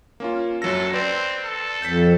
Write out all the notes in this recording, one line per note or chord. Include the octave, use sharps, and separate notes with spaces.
A#3 C#4 F4
F#2 F#3 A4 A#6
C4 B4 D5 C6
A4
F2 G6 A6 B6